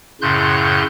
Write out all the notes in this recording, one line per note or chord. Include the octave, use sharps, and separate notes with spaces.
F#2 A2 C#3 C6 F#6 G6